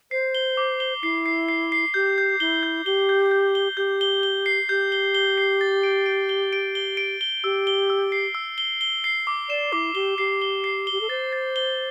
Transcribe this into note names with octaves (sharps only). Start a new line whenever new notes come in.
C5 C7
G7
D6
G7
E4 C7
C7
C7
C7
G4 G6
G6
E4 G7
G6
G4 G7
G6
G6
G7
G4 G6
G7
G7
C7
G4 G6
G7
G7
C7
A6
D7
D7
G7
D7
G7
D7
G7
G4 E6
G7
E6
C7
E6
G7
G7
C7
D6
D5 E7
E4 D6
G4 G7
G4 C7
G7
C7
G7
G4
A4
C5 A6
A6
G7